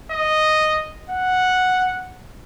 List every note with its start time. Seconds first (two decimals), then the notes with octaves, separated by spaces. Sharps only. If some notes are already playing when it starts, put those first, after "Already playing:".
0.11 D#5
1.10 F#5